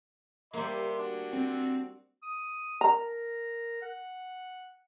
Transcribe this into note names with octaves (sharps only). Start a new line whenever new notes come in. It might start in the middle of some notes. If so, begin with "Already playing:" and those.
G3 A#3 E5 C6 D6
D4 F#4
C4
D#6
A#4 A#5
F#5